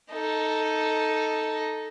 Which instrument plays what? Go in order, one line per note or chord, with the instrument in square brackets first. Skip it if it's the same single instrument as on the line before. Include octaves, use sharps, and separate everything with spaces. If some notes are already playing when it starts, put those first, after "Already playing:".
[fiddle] D#4 A4